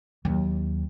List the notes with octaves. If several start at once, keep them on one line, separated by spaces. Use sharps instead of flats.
D#2 F#3